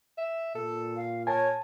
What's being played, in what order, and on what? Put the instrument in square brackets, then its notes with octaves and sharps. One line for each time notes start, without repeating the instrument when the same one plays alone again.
[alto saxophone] E5
[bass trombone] A#2 [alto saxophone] A4
[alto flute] F5
[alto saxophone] A#4 [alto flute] C#5 [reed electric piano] G#5 A5